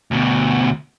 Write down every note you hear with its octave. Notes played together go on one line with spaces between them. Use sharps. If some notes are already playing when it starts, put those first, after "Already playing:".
D2 B2